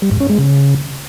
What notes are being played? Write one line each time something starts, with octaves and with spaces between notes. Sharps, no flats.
G3
G#2
C#4
G#3
C#3